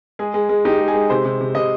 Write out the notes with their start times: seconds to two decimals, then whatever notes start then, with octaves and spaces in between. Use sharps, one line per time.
0.19 G#3 G#4
0.34 G#3
0.49 G#3
0.65 D#4 G4
0.80 G#3
0.88 G#4
0.94 G#3
1.10 C3 C5
1.24 C3
1.41 C3
1.55 C3 D#5